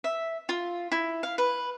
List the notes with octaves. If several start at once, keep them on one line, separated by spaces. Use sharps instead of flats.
E5
F4
E4
F5
B4